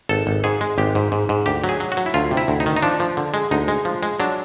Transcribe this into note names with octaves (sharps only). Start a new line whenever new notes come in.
G#1 A4
G#1
G#2 G#4
G#3
G#1 G4
G#2
G#2
G#2
D2 G4
F#3
G#4
F#3
F#4
F#3
E4
D2 F4
C3
E4
D2
D#4
D#3
D#4
F3 D4
F3
D3
G#3
D2 D#4
G#3
F3
G#3
F#3 D4